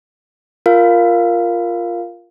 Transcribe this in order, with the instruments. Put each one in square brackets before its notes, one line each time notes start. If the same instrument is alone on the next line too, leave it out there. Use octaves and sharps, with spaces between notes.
[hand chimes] F4 A#4 F5